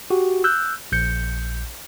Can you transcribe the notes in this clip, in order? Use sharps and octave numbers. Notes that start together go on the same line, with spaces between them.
F#4 G4
E6 F#6 G6
A#1 G6 C#7